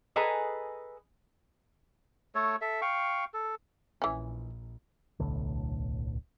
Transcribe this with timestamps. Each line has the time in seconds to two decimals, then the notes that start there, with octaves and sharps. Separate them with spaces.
0.16 G#4 A4 B4 D#5 G#5 A#5
2.35 A3 A4 C#5
2.61 A4 E5
2.82 F5 G5 C#6
3.34 A4
4.02 A#1 E3 C#4
5.20 D1 B1 A2 D3